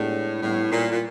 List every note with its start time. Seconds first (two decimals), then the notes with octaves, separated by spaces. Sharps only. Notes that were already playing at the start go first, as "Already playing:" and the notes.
Already playing: A2 G#3 B3 D4 G4
0.43 A2 G3 B3 E4
0.72 A#2
0.92 A#2